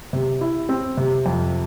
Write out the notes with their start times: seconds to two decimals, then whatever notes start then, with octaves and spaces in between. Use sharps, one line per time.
0.13 C3
0.41 E4
0.69 C4
0.97 C3
1.26 F2